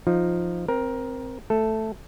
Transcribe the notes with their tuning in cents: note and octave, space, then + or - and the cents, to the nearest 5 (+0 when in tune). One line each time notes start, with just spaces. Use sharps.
F3 +0 D#4 +0
C4 +0 A#4 +15
A3 +0 A4 +0